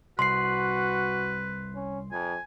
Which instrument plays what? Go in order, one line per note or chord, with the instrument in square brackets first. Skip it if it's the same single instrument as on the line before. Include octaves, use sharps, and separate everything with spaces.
[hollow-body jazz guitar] C2 [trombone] F#4 [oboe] B4 [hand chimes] C6 C7
[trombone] C#4
[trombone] F2 [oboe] G#5